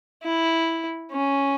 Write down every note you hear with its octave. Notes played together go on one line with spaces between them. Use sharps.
E4
C#4